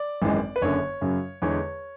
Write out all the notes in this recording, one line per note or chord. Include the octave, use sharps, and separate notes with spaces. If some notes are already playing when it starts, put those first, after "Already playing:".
Already playing: D5
G#1 F#2 E3 G#3
B4
F#1 F#2 D3 C#5
F#2 C#3 F#3
E2 D3 G#3 C#5